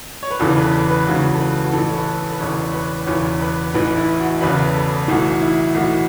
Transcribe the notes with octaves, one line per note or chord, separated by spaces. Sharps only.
C#5
B4
E1 E2 C#3 E3 A4
B4
B4
B4
C#2 C#3 E3 F#4
A4
B4
F#4
A1 A2 E3 A4
C#5
B4
A4
B4
E1 E2 C#3 E3 C#5
C#5
B4
E1 E2 C#3 E3 C#5
B4
A1 A2 E3 B4
E4
F#4
E1 E2 C#3 B4
A4
B1 A2 E3 F#4
E4
B1 A2 E3 F#4